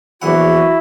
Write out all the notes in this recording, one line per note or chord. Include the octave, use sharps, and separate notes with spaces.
A#1 E2 E4 F#4 F#5